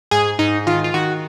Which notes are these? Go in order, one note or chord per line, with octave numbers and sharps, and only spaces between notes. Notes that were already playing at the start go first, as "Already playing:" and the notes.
G#2 G#4
G#2 D#4
D#3 F4
F4
D#3 F#4